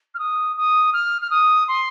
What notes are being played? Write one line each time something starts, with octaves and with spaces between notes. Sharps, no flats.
F6
D#6
D#6
F6
F6
D#6
C6